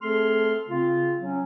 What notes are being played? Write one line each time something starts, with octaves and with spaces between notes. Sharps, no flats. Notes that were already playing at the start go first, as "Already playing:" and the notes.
A3 C4 G#4 A4 C6 F6
C#3 C4 F4
F#3 C#4